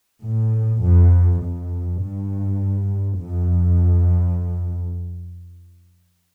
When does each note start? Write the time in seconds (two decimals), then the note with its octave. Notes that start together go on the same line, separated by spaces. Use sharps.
0.24 A2
0.83 F2
1.42 F2
2.02 G2
3.20 F2